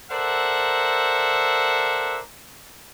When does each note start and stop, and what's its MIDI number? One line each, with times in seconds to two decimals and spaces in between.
0.10 2.19 69
0.10 2.19 70
0.10 2.19 72
0.10 2.19 74
0.10 2.19 76
0.10 2.19 78